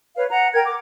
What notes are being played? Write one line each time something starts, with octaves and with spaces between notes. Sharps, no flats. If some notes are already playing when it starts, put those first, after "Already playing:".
B4 C#5 F5
F#5 A#5
A#4 G5 G#6
D6